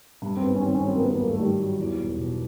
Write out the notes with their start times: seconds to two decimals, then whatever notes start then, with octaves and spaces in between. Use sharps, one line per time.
0.22 G2
0.37 C4
0.42 G#1 B3
0.56 C#4
0.61 D#3 C4
0.75 C#4
0.81 F#3
0.88 C4
0.95 A#3
1.00 G2 B3
1.10 B3
1.20 G#1 A#3
1.30 A3
1.39 D#3 G3
1.58 F#3
1.78 E2
1.98 E1
2.18 B2